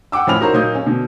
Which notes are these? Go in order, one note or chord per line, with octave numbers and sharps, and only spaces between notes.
F#5 G5 D6 E6
A1 F3 C#4 B5 F6 F7
D#4 F#4 A#4 C5 C#5 A#5
A#2 F#3 A#3 D#4 D#6 G6
C#4
B2 D3